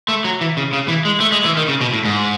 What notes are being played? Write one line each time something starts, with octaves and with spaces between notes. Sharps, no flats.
A3
F#3
E3
C#3
C#3
E3
G#3
A3
G#3
E3
D#3
C#3
B2
A2
G#2